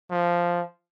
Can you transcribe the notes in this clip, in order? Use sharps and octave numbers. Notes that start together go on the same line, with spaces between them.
F3